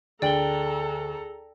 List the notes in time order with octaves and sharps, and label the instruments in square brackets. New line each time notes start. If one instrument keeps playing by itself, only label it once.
[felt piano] D2 [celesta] G#4 F#7 G7 [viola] A4 A#5 [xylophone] D5 G5